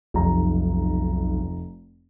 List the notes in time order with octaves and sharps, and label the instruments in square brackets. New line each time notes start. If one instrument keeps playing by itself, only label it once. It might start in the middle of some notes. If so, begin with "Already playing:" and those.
[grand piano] F1 A#5 [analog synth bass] B1